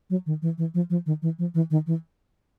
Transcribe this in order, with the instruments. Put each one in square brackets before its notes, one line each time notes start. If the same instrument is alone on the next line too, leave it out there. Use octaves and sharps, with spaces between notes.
[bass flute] F#3
D#3
E3
E3
F3
F3
D#3
E3
F3
E3
D#3
E3